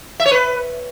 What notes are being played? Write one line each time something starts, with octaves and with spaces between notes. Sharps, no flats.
E5
C#5
B4